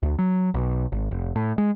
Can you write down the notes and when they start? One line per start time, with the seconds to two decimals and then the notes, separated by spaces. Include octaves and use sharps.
0.03 D2
0.19 F#3
0.54 B1
0.92 G#1
1.11 F1
1.36 A2
1.58 G#3